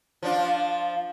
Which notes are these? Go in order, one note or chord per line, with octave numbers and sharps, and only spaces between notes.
F3 D4 F4